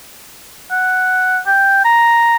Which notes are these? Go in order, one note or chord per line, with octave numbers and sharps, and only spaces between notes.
F#5
G5
A#5